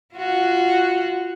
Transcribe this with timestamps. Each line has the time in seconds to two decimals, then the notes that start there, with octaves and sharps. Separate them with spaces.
0.15 F4 F#4